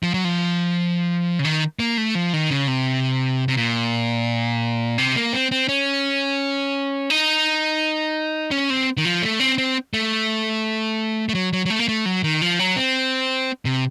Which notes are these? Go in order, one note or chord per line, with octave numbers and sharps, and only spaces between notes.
F3
F#3
F3
C#3
D#3
A#3
A3
F3
D#3
C#3
C3
C3
A#2
C3
A#3
C4
C4
C#4
D#4
C#4
C4
D#3
F3
A3
C4
C4
A3
A3
F#3
F#3
F#3
A3
A#3
A3
F#3
D#3
F3
F#3
C4
C3